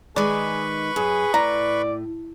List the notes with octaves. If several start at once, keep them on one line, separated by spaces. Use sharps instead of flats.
D#3 G#3 G#4 B4 D5 B5 C#6
F#2 G#4
A2 D5 A#5